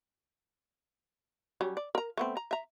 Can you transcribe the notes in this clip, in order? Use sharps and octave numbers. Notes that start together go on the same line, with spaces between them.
F#3 G3 C#4
D5
A#4 A#5
A3 B3 C4
A#5
E5 A#5